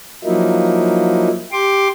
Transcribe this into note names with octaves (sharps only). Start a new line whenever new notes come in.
F3 F#3 A#3 D#4 E4
G4 C6 D6